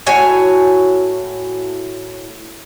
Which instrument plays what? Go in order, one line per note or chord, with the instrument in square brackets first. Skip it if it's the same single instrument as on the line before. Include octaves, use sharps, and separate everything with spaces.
[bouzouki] A2 F#4 C#5 G#5